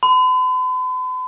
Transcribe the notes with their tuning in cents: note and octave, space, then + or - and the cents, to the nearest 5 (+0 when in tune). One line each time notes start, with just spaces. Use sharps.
B5 +45